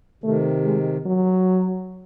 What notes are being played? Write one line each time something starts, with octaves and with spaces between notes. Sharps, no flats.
C3 D#3 A3
G#3
F#3